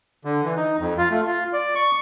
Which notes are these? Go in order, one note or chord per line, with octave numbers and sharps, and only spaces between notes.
D3
E3
D#4
F2
F4
A3
F4
D5
C#6